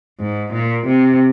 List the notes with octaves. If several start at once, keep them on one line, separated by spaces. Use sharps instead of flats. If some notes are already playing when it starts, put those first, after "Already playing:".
G#2
A#2
C3